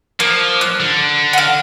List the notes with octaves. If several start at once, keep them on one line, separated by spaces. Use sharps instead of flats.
F3 A#3
F#6
D3
F#4 F5